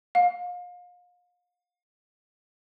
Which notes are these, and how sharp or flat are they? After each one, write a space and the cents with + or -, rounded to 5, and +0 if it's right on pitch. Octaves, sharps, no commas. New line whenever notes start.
F5 +35